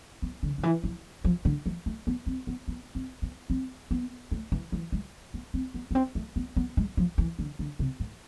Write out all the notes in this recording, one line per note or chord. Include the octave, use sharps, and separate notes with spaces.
B3
D3
D3
E3
F3
F3
D3
F3
A3
B3
C4
B3
B3
C4
B3
C4
B3
A3
E3
E3
G#3
B3
C4
B3
B3
C4
A3
B3
B3
G#3
F3
E3
D3
D3
C3
A2